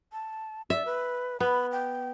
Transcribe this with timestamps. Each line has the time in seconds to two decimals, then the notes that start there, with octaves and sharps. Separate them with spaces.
0.13 A5
0.70 D5 E5
0.86 B4
1.40 B3 B5
1.72 G5